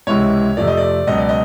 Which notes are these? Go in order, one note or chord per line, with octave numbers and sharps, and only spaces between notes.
C#2 C3 E3 G#3 C#5
F2 C3 F3 A3 D5
D#5
D5
C#2 B2 F#3 D#5
D5
D#5